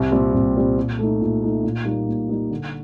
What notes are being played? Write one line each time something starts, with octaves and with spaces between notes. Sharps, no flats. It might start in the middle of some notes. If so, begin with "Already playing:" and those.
Already playing: C2
A#2 G3 C4
C2
A#2 G3 C4
A#2
A3 D#4
A#2
A3 D#4
A#2
G3 A#3 D#4
A#2
G3 A#3 D#4
D3